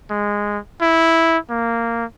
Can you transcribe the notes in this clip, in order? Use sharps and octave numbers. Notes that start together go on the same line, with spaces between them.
G#3
E4
A#3